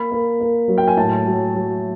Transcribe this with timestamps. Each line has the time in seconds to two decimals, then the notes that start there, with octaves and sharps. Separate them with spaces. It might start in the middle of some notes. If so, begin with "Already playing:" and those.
Already playing: A#3 B5
0.11 A#3
0.40 A#3
0.68 F#3
0.78 G5
0.88 G#5
0.97 A2 A5
1.26 F#3
1.55 F#3